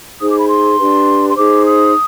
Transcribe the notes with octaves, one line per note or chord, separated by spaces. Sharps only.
D#4 G#4 C5 D#6
D6
B5
C6
D4 G4 B4
C6
D#4 G#4 C5 D6
D#6